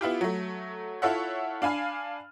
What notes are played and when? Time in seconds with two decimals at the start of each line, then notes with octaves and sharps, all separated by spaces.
0.01 B3 E4 F4 G4
0.21 F#3 A3
1.02 E4 F4 A4 C#5 E5 F#5
1.62 D4 F5 G#5 B5 F6